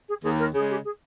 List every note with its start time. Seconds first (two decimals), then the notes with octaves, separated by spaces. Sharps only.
0.09 G#4
0.23 D#2 G#4
0.39 A#4
0.53 C#3 G#4
0.58 G#3
0.70 G4
0.85 G#4